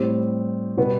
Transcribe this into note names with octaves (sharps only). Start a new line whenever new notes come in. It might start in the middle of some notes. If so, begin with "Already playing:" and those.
Already playing: A2 G3 C4 G4 C5
B2 G3 B3